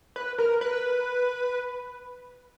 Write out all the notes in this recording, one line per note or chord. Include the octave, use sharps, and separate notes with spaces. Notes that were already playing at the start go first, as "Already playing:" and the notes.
B4
A#4
B4